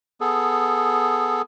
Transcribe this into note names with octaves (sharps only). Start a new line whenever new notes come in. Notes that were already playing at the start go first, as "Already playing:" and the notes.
B3 G#4 A4